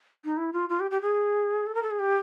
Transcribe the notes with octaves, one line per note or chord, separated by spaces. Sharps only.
D#4
E4
F4
F4
G4
G4
G#4
A4
A#4
A4
G#4
G4